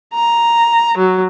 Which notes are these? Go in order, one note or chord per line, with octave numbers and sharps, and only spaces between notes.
A#5
F#3